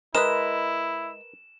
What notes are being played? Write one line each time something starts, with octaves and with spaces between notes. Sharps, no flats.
G#3 E4 A#4 B4 D#5 E7